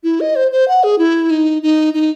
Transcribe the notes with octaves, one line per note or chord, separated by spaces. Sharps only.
E4
D#5
C5
C5
F#5
G#4
E4
D#4
D#4
D#4